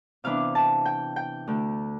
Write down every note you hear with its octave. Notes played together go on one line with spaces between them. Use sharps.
C3 E3 B3 D4 F5
A5
G5
G5
D2 D3 A3